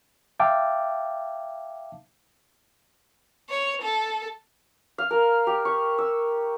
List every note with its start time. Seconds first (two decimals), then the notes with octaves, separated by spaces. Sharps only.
0.40 E5 F5 G5 A5 D6
3.50 C#5
3.82 A4
4.98 F5
5.11 A#4
5.47 G4
5.65 C#6
5.98 E6